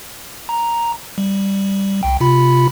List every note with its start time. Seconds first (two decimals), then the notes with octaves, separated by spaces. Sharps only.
0.49 A#5
1.18 G3
2.03 C2 G5
2.20 C3 F4 B5